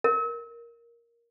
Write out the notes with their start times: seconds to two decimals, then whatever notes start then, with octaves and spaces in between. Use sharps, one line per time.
0.04 A#4